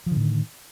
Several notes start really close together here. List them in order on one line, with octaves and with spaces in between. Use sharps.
F3 D3 A2 D#3